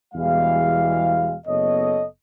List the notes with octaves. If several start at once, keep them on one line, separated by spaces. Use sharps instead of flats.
E2 B2 E3 G3 G#3 F5
F#1 B3 A4 C#5 D#5